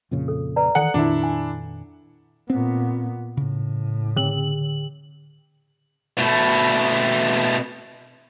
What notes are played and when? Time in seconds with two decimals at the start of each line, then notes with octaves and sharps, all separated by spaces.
0.11 F2 A#2 C#3
0.28 A4
0.56 B4 D5 A#5
0.75 D#3 E3 A4 D5 F#5
0.94 F2 A#2 D#3 D4 E4
1.23 G#5
2.50 A#2 B3 C4
3.37 A2 C#3
4.17 D3 F#7
6.19 B2 A3